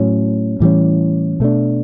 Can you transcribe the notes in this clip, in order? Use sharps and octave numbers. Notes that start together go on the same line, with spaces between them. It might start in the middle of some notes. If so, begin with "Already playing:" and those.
Already playing: A2 F#3 C#4
A2 E3 G3 C#4
B2 A3 D4